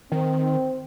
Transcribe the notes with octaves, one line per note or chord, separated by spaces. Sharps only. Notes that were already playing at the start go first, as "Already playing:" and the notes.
D#3 C4